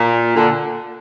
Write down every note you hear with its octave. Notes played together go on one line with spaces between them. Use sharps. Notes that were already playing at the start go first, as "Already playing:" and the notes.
Already playing: A#2
A#2 D3